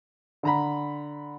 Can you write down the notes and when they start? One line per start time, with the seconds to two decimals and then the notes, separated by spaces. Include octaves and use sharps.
0.43 D3 A#5 B5